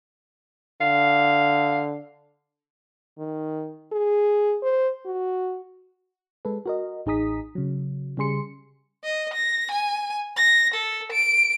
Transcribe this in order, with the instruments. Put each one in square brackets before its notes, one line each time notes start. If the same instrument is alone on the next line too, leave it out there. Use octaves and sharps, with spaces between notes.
[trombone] D3 [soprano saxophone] F5
[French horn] D#3
G#4
C5
F#4
[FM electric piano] G#3 A4 B4
F#4 A#4 D#5
A1 D#4 G#4 A#5 D#6 B6
C#3 F#3
C#3 G3 G#4 C6 C#7
[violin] D#5
A#6
G#5
A#6
A4
D7